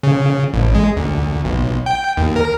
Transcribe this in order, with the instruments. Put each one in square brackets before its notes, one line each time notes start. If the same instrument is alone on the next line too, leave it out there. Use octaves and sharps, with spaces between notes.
[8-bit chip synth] C#3
A1
G#3
D2
B1
G5
D#2
A#4